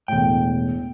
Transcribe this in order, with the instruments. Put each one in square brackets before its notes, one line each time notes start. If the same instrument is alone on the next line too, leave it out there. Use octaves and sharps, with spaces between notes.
[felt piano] E1 A2 [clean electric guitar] G5